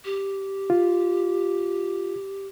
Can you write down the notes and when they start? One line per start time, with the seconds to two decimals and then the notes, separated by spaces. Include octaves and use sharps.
0.05 G4
0.70 F4